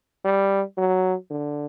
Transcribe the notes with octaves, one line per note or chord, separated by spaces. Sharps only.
G3
F#3
D3